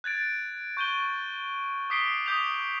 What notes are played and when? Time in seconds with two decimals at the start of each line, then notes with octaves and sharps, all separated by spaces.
0.04 F#6 G#6 A6 D7
0.77 C#6 G6 D#7 G7
1.90 D6 D#6 B6 C7 D7 G7
2.26 D6 D#6 G6 B6 F7